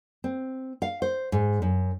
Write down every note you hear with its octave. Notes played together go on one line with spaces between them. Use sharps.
C4
F5
C5
G#2
F#2